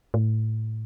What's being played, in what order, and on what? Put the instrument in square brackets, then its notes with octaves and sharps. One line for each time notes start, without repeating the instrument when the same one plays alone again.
[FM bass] A2